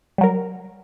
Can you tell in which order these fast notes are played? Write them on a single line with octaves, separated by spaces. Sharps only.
G3 F#3 A#4